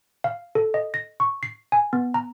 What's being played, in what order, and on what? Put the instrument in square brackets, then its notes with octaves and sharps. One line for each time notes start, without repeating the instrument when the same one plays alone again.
[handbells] F5
A4
D#5
A#6
C#6
C7
G#5
B3
A#5